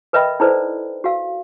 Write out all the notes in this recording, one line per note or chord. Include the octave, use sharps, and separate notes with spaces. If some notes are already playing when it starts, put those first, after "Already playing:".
A#4 B4 D#5 E5 G5 B5
D#4 E4 A4 B4 C5 D5
F#4 F5